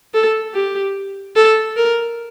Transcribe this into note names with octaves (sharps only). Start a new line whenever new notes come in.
A4
G4
A4
A#4